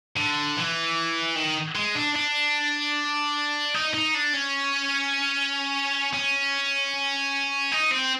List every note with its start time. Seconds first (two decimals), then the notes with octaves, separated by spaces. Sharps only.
0.16 D3
0.56 E3
1.35 D#3
1.75 G#3
1.95 D4
2.16 D4
3.74 D#4
3.94 D#4
4.14 D4
4.34 C#4
6.14 C#4
7.72 D#4
7.91 C4